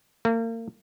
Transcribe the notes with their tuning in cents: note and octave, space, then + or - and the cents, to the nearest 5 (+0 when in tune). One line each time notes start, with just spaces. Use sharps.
A#3 -35